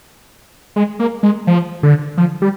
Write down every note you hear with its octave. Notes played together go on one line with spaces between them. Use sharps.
G#3
A#3
G#3
F3
D3
F3
G3